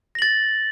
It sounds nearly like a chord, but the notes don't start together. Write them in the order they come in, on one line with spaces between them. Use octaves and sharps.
A#6 F#7 A6